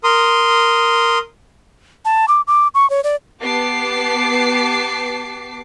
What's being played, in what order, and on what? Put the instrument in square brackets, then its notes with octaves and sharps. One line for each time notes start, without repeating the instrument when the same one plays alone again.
[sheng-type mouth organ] A#4 C6 D#6
[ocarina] A5
D6
D6
C#6
C#5
D5
[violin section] B3 G4 A5 D6 C7